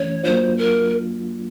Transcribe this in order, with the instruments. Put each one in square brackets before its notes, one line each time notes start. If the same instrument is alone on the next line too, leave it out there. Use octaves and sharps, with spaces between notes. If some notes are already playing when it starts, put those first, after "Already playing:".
Already playing: [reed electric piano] E3 A3 C#4 [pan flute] C#5
[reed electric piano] F#3 A#3 D4 F4 [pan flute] C5
[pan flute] A#4